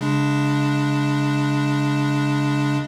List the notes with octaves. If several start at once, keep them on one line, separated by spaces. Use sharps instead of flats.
C#3 G#3 D4